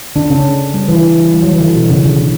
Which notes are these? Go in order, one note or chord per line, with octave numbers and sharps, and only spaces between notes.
D3 D4
C#3 C#4
G3
E3
G3
F#3
E3
D3
B2
C#3
D3
D3